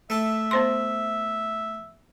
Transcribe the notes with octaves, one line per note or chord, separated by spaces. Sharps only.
A3 A4 E5
B3 C5 C6